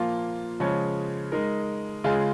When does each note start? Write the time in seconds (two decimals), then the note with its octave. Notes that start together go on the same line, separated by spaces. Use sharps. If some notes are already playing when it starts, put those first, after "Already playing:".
Already playing: A#2 F3 A#3 F4
0.60 C#3 F3 G#3 C#4
1.32 G#3 D#4 A#4
2.04 C#3 G#3 F4 G#4